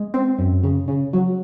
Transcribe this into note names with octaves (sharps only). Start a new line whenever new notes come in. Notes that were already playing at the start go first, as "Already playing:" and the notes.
Already playing: G#3
C4
F#2
C#3
C#3
F#3